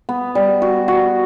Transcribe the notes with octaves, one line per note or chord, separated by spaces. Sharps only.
B3
G3
F#4
F#4